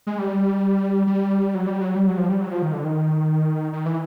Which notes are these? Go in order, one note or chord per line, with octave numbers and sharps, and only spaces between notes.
G#3
G3
G3
F#3
G3
F#3
G3
F#3
F3
G3
F#3
F3
D#3
D3
D#3
D#3
E3